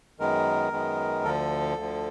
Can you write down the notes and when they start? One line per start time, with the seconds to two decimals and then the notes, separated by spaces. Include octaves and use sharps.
0.20 F#2 D#3 G#3 B3 A#4
0.72 F#2 D#3 G#3 B3
1.24 D2 D3 F3 A4
1.77 D2 D3 F3